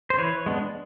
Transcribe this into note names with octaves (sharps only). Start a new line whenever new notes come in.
C5
E3 B4 C#5
G#3 B3 D4